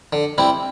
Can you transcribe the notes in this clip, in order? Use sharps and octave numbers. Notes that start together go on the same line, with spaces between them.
D3
G3 C4 E4